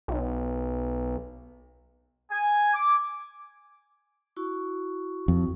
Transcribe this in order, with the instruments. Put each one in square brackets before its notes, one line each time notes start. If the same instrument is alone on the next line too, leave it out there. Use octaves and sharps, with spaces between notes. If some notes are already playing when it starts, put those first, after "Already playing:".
[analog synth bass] B1
[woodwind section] G#5
D6
[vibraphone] E4 F#4 C#6
[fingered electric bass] F2